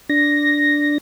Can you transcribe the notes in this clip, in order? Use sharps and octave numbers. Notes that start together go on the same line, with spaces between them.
D4 A#6